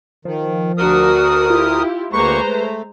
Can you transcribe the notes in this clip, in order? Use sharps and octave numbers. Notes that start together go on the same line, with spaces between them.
D#3 F3
D2 D4 F#4 A#4 D#6
E4 F4 G4
D2 G#3 A#3 B4 C5 A#5 C#6
A3